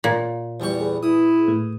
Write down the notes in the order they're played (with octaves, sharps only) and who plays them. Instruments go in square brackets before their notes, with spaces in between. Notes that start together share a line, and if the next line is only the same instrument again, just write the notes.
[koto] A#2
[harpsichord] E2 G3 C#6
[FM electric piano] G#4 B4
[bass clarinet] E4 [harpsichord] D#6
[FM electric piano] A2 A3